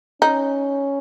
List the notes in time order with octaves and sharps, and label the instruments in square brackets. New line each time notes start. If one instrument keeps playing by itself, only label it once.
[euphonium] C#4 [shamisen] D#4